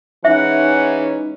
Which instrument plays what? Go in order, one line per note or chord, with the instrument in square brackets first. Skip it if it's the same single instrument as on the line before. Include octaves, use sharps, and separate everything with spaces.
[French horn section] E3 G#3 C#4 [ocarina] D#4 [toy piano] E5 [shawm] F#5